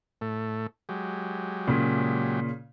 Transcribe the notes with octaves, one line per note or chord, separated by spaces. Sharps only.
A2 A3
F#3 G#3 G4
A#2 C#3